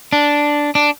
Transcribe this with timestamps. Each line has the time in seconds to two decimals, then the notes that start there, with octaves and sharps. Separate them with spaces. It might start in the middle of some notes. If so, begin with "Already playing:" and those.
0.13 D4
0.75 D4